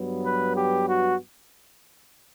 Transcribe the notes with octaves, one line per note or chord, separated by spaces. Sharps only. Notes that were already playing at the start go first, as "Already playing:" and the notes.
Already playing: G2 F#3 B3
B4
G4
F#4